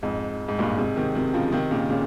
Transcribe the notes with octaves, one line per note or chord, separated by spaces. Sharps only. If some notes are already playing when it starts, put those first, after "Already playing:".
F2 G#2
G#2
G2 A#2
G#2 C3
C3 D#3
C3 D#3
C#3 F3
C3 D#3
A#2 C#3
A#2 C#3